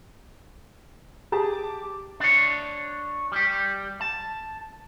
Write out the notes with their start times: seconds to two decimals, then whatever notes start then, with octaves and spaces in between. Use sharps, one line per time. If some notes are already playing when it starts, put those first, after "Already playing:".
1.32 G4 G#4 A5
1.53 D6
2.20 D4 C#5
3.32 G3 G4
4.01 A5